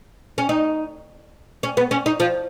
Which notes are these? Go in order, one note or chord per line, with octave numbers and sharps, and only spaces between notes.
C#4
D#4
C#4
B3
C#4
D#4
F3